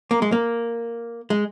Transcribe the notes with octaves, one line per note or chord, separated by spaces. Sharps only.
A#3
G#3
A#3
G#3